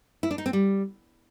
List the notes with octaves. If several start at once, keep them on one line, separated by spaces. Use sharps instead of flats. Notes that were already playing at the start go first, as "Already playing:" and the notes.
E4
D4
D#4
C4
G3